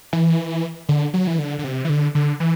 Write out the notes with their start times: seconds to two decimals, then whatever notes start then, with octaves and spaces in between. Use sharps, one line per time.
0.13 E3
0.89 D3
1.14 F#3
1.27 E3
1.38 D3
1.59 D3
1.64 C3
1.85 E3
1.89 D3
2.15 D3
2.40 E3